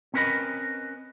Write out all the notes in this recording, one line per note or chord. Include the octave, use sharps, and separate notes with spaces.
C4 C#4 A#4 B4 D#5 B5